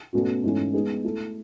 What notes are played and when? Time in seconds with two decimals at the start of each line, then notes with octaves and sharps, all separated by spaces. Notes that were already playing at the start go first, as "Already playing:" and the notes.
0.13 B2 A3 C#4 F#4
0.44 G#2 E3 A3 C#4 E4
0.73 G#3 B3 D#4 G#4
1.04 A3 E4 A4